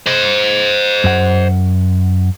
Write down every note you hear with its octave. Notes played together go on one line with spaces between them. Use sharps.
C5 D#5
F#2 F#5